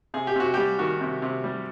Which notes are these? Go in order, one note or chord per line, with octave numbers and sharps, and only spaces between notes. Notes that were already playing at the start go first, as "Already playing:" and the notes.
C3 G#4
G4
C3 F#4
G4
G3
D#3 F#4
C3
C3
G3